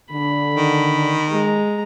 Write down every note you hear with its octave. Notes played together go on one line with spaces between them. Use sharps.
D3 B5
D#3
G#3 A#5